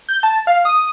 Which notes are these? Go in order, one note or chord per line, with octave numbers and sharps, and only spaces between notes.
G6
A5
F5
D#6